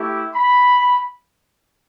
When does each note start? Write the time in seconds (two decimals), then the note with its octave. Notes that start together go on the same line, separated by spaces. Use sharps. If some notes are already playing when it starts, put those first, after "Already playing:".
Already playing: A3 E4 G4
0.35 B5